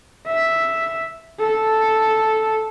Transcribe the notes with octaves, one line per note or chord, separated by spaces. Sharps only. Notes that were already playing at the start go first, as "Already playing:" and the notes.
E5
A4